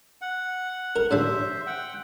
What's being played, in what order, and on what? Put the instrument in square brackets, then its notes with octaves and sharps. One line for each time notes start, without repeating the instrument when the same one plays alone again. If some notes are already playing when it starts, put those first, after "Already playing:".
[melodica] F#5
[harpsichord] A#4
[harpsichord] A1 F#3 D4 [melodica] C5 E5
[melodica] F#5 G5